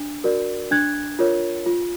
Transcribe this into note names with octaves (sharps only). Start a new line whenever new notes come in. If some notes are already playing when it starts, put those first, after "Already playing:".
Already playing: D4
F#4 A#4 D5
D4 F#6 G#6
F4 A#4 C#5
F4